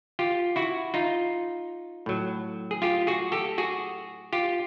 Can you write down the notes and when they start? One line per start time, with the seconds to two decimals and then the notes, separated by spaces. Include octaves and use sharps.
0.19 F4 G4
0.56 E4 F#4
0.94 D#4 F4
2.06 A2 F#3
2.71 G#4
2.82 F4 G4
3.07 F#4 G#4
3.32 G4 A4
3.58 F#4 G#4
4.33 F4 G4